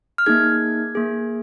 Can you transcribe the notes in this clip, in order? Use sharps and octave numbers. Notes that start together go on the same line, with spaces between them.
F6
A#3 D#4 G#4 G#6
A#3 G#4